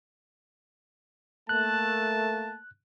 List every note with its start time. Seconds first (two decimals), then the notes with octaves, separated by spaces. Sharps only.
1.49 A3 A#3 A5 F#6